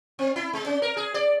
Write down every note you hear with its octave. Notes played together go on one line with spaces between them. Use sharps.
C4
E4
G#3
C#4
A#4
G#4
D5